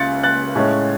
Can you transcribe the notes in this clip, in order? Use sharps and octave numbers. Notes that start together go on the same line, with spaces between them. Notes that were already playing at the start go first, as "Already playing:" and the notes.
Already playing: C#2 F#6 A6 C#7
F#6 A6
A2 G#3 C#4